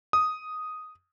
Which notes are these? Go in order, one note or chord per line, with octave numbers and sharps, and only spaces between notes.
D#6